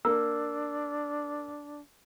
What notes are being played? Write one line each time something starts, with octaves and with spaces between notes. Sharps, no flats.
A#3 D4 E6